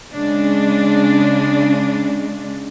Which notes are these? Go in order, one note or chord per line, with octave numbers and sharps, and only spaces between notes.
C#3 G#3 D4